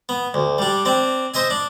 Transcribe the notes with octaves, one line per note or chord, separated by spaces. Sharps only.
B3
D2
G3 D4
C4 D4
C5 D#5 E5 G#5
D4